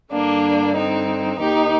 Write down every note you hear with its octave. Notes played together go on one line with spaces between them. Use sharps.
G2 D3 A#3 D4
C4 D#4
D#2 D#3 D#4 G4